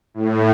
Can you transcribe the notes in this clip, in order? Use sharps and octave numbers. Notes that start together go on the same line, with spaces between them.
A2